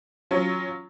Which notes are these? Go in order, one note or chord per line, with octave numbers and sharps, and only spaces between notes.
F#3 C#4 F4